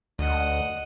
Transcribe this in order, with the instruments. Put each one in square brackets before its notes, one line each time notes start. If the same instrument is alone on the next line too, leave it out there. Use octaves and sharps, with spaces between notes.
[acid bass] D2 [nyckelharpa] D#5 F#5